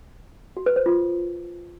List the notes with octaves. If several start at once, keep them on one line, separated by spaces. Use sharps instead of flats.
F#4
B4
C5
F4